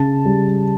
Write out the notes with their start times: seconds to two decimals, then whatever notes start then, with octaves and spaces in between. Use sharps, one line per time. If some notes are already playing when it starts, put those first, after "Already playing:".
Already playing: C#3 A5
0.25 G3